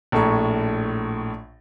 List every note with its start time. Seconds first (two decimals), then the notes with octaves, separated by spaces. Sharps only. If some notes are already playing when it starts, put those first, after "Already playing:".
0.12 A#1 A2 A4 A#5 C#6